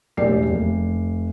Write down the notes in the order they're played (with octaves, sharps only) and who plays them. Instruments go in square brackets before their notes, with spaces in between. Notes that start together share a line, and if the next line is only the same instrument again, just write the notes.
[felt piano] E1 A1 G4 D5 C7
F1